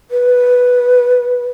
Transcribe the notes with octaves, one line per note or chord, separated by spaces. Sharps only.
B4